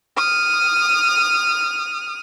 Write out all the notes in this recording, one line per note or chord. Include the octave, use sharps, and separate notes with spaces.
D#6 F6